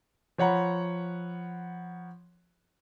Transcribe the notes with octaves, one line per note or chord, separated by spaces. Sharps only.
F3 C#5 F#5 A#5 B5